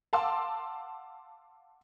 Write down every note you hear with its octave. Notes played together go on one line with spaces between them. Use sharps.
F5 F#5 A5 C6 D6 E6